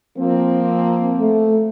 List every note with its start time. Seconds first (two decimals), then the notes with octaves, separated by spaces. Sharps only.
0.18 F3 A#3 C4
1.20 A3